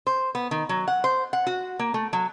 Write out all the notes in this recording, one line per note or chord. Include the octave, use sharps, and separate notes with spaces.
C5
B3
D#3
F#3
F#5
C5
F#5
F#4
A#3
A3
F#3